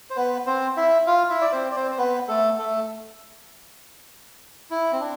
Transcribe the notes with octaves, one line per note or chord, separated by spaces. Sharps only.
C5
B3 B4
C4 C5
E4 E5
F4 F5
E4 E5
D5
C4 C5
D5
C4 C5
C5
B3 B4
A3 A4
A3 A4
E4
C4
D4